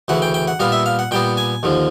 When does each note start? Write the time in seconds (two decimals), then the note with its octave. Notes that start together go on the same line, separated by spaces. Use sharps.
0.08 D2 C#3 E3 F#5
0.22 G5
0.34 G5
0.48 F#5
0.60 A#2 G3 B3 F5
0.72 E5
0.86 F5
0.99 F#5
1.11 A#2 G3 B3 G5
1.37 G#5
1.63 D#2 D3 F3